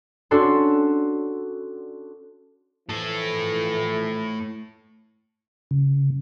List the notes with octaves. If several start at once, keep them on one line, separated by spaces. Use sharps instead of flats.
C#4 D4 F#4 A4 C6
A2 E3 F3 A3 A4
C#3